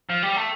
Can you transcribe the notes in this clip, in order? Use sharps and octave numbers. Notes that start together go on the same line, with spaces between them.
F3
G3
A3